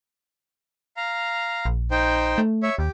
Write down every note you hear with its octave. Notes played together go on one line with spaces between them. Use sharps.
F5 A#5
A#1
D#4 C5 G5
A3
C#5 E5
D#2 G4